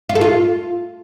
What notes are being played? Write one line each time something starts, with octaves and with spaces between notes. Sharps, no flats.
F4
A4
F4